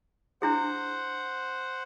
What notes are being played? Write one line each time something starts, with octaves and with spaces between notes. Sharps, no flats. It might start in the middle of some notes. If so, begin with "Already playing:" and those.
D4 E4 G#4 C5 F#5